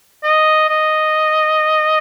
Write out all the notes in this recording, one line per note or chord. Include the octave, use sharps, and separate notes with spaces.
D#5
D#5